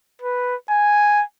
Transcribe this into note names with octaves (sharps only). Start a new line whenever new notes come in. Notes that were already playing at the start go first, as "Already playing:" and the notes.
B4
G#5